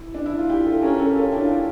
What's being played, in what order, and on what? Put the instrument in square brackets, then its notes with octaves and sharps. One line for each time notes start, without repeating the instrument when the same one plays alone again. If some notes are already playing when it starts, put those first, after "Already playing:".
Already playing: [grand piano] E4
D4
E4
F4
E4 G4
F4 A4
[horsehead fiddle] C#4 [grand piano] G4 A#4
[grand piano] A4 C#5
G4
F4 A4
[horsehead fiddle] D4 [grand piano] E4 G4
[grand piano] F4
E4 G4